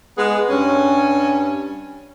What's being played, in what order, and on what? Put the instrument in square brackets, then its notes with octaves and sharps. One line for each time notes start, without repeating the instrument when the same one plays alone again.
[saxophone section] G#3 B3 G#4
G2 C#4